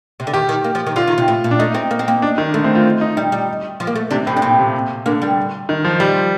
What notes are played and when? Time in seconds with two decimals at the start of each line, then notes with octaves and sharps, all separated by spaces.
0.20 C3
0.27 D3
0.33 D#3 G4
0.49 D#3
0.64 A#3
0.75 F3
0.87 D#3
0.96 D3 F4
1.07 D#3
1.18 C3
1.28 A2
1.44 A#2
1.51 D4
1.59 A3 D#4
1.75 C4
1.91 A#3
1.99 C4
2.08 A#3
2.22 D4
2.38 D#3
2.54 D3 A3
2.64 C4
2.75 F4
3.01 D#4
3.17 G3 D#4
3.32 G3
3.80 F3
3.87 A#3
3.95 A3
4.11 C3 D4
4.27 A2 C4
4.37 D4
4.42 A#2 C4
4.59 C3
5.06 D3 A#3
5.22 G3
5.69 D#3
5.84 F3
6.00 F3 G3